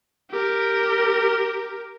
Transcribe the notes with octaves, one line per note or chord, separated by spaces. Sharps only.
G4 A#4